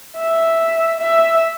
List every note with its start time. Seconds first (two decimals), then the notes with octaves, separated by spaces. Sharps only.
0.18 E5
1.00 E5